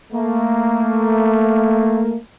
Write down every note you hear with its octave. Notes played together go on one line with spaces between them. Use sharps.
A3 A#3